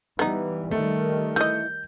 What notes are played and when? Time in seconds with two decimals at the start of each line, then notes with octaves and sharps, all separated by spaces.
0.19 E3 G3 B3 D#4
0.71 D#3 G3 A3
1.36 E3 D#5 G6